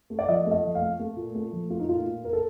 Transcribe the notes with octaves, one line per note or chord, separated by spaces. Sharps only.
A3
D5
F3 D#5
A3
D#5
F3
F5
A3
A3
A#2
A3
F3
A3 F4
D#4
A#2 F4
A#2
A#2 A#4
A4